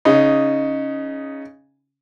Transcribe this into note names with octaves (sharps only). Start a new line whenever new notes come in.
C#3 D#4